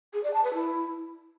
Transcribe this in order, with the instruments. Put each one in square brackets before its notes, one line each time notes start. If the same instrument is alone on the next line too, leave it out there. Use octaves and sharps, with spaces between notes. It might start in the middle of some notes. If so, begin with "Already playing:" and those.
[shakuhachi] G#4
D5
A5
B4
E4